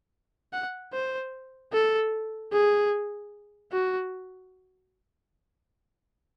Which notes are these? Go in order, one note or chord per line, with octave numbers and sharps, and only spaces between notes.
F#5
C5
A4
G#4
F#4